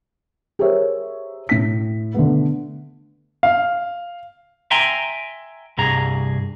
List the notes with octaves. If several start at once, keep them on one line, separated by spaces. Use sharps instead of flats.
G4 G#4 A#4 C5 C#5 E5
A2 B6
D3 A3 B3
F5
E5 G5 G#5 A#5 C6
C2 G2 G#4 A#5